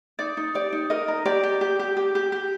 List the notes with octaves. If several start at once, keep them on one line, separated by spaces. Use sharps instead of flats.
D#4 D5
D#4
G4 D5
D#4
A#4 D#5
A#4
G4 D5
G4
G4
G4
G4
G4
G4